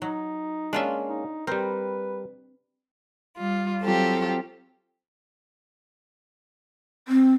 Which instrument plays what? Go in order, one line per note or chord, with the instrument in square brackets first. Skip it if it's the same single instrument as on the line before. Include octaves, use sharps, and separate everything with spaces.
[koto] F#3 [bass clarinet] D#4
[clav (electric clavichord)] G#3 A#3 C#4 [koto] D4 F4 E5
[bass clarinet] D#4
[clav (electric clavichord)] G3 A#4 [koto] C4 [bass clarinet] B4
[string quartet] G3 F4
F#3 C4 F4 G4 A4
[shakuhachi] C4